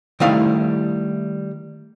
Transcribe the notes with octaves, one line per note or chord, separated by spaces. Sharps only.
D#3 G3 A3 E4 F5